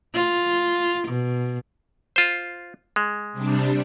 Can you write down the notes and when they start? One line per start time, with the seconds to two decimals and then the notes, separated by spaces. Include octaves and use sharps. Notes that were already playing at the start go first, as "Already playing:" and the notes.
0.14 F4
1.08 B2
2.16 F4 C5
2.96 G#3
3.32 C3 G3 D4